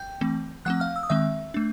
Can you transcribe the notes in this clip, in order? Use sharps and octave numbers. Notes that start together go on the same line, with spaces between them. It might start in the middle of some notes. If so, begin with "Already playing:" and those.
Already playing: G5 G6
E3 A3 C4
F3 A3 C4 F#5 F#6
F5 F6
E6
D#6
D#3 G#3 C4 E5 E6
A3 D4